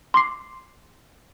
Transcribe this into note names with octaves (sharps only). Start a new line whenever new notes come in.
C6 D6 C7